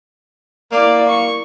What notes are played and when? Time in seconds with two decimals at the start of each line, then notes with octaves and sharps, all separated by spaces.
0.72 A#3 E4 D5
1.09 C#6